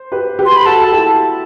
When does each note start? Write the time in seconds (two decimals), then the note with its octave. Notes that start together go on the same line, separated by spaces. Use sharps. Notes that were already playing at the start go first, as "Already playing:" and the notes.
Already playing: C5
0.12 G4 B4
0.39 G4 B4
0.46 C6
0.56 B5
0.66 F#4 A4 A5
0.83 A4
0.92 E4 G4